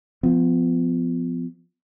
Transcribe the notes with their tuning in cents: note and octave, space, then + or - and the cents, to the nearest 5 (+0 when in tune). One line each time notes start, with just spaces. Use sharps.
F3 +0 B3 +35